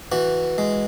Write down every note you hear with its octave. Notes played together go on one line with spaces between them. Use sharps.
E3 F#4
G#3